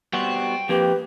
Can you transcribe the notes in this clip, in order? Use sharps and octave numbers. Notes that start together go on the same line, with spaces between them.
G3 B3 F#4 G5 C6
F2 A#3 G4 B4